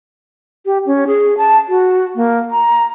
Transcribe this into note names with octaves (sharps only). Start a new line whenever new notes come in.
G4
C#4
G#4
A5
F#4
A#3
A#5